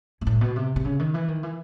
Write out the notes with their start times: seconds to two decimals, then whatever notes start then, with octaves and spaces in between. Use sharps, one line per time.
0.21 A#2
0.27 A2
0.41 B2
0.56 C3
0.76 C3
0.85 C#3
0.99 D#3
1.14 E3
1.28 D#3
1.43 E3